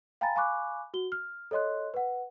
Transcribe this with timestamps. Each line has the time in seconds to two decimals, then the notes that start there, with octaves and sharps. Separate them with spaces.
0.21 F5 G5 G#5 A#5 B5 A6
0.36 F5 G#5 B5 C#6 D6 F#6
0.94 F#4 G7
1.12 F6
1.51 A4 C#5 D#5 C6 F#6
1.94 B4 F#5